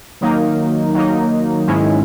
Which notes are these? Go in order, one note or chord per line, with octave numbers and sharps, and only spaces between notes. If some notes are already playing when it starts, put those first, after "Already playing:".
D#3 F#3 A#3 D#4
D#3 F#3 A#3 D#4
G#2 D#3 G#3 C#4 E4